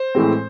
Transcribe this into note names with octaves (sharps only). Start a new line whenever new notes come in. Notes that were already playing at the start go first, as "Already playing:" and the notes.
Already playing: C5
A2 E3 G#3 C4